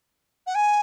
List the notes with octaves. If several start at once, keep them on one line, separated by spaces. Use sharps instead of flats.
F#5
G#5